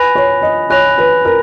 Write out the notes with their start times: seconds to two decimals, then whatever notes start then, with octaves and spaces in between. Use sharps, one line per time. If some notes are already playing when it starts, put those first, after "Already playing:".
Already playing: B4 G#5 B5 F#6 A#6 F7
0.15 C#5
0.42 D#5
0.70 C#5 G#5 B5 F#6 A#6 F7
0.98 B4
1.25 A#4